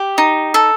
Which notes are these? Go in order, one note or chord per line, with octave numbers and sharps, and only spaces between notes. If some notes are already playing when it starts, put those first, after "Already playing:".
Already playing: G4
D#4
A4